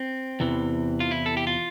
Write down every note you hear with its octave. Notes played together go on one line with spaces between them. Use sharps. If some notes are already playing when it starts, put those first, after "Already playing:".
Already playing: C4
E2 C3 E3
F4
E4
A4
G4
F4